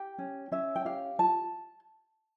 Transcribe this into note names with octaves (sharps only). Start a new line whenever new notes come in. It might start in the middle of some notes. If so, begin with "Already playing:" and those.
Already playing: G4 G5
C#4
C#4 E5
G5
G4 F5
F4 A5